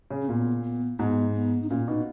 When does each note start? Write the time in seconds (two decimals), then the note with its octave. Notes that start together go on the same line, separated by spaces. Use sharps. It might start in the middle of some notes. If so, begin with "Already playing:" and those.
0.11 C#3
0.22 C#4
0.28 A#2 B3
0.64 B3
0.99 G#2 B3
1.34 B3
1.63 D#4
1.69 A#2 C#4
1.88 B2 D#4